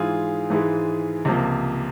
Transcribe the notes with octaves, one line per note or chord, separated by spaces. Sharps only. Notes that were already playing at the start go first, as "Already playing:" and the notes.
Already playing: G#2 E3 G#3 F4 G#4
G#2 E3 G#3
C#2 C3 F3 A#3